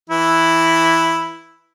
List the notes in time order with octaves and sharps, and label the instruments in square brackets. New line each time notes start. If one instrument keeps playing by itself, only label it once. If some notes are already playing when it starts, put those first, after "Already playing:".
[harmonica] E3 E4